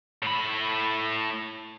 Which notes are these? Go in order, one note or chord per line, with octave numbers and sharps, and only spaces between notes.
A2 B5